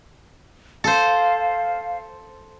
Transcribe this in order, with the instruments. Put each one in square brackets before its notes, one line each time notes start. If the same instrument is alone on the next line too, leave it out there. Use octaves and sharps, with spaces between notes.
[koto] A4 C5 [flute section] F5